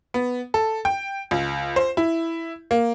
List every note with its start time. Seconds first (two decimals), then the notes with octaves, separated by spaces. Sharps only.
0.14 B3
0.54 A4
0.85 G5
1.31 C#2
1.76 C5
1.97 E4
2.71 A#3